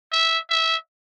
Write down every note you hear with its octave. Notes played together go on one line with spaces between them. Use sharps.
E5
E5